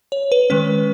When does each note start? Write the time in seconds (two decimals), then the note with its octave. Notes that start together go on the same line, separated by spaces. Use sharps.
0.12 C#5
0.32 B4
0.50 D#3 G#3 C#4 B4